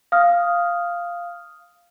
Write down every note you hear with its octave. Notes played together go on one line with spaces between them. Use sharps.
F5 D#6 F6